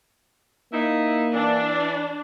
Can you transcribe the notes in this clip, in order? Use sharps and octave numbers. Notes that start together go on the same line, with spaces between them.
A#3 D#4 E4
E3 D4